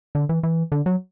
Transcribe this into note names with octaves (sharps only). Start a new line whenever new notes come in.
D3
E3
E3
D3
F#3